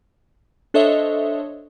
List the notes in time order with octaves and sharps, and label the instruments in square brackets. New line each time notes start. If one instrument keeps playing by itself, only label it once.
[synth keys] D4 A4 C5 C#5 D#5 E5